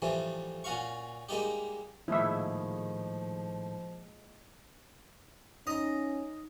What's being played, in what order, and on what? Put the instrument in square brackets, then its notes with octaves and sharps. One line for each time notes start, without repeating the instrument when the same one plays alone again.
[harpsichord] A2 E3 F3 G3 A3
A#2 C#4 F#4 F5 C#6
G3 G#3 A#3 D#4 G4
[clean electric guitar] A2 D#3 [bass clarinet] F3 [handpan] G#3 A#3 F4 [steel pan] E4 E5
[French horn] C#4 [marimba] D#4 [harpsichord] D#5 A#5